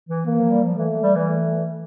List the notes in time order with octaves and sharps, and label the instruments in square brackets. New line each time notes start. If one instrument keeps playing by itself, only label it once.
[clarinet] E3
[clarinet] E3 [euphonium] A#3
[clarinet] F3
G3
F3
[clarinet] E3 [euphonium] A3
[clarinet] G3
E3
[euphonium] A3